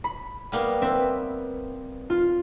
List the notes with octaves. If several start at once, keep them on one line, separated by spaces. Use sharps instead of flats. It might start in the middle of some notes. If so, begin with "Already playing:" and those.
B5
G3 A#3 B3
C4 B4 E5
F4